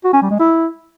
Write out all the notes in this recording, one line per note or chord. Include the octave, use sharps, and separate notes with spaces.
F#4
C#4
G3
G#3
E4